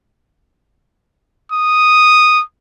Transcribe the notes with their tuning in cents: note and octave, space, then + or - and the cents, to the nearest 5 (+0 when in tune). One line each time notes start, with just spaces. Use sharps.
D#6 -5